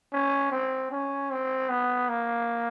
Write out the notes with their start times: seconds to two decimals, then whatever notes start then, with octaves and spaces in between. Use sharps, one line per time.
0.12 C#4
0.52 C4
0.91 C#4
1.31 C4
1.69 B3
2.09 A#3